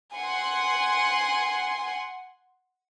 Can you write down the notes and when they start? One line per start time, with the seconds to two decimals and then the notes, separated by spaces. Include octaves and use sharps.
0.15 F#5 G#5 C6